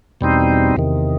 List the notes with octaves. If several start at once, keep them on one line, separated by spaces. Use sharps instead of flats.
E2 B2 G3 C4 D#4
E2 C3 D#3